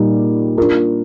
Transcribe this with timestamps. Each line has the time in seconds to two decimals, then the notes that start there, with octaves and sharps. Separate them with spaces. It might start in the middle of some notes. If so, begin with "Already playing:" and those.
Already playing: A#2 G3 A#3 D#4
0.58 A#3 D4 F4 A#4